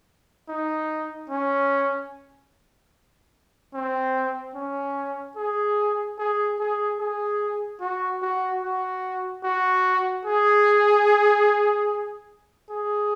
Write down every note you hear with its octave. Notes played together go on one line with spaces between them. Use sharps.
D#4
C#4
C4
C#4
G#4
G#4
G#4
G#4
F#4
F#4
F#4
F#4
G#4
G#4